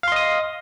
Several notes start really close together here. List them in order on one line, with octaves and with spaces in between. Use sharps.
F5 C6 D#5 D#6